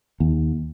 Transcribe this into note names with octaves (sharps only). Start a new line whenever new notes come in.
D#2